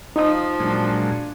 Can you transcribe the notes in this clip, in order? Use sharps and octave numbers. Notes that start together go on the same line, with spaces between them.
F3 D#4 D#6
A#2 F#3 G#3 D4